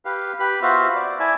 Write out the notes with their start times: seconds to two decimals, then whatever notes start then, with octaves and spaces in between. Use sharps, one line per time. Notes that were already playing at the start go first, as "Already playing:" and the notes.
0.05 G4 B4 F5
0.40 G4 B4 B5
0.62 B3 F4 F#4 C5 E5 F5
0.95 D5
1.20 E4 D5 E5 G#5 A5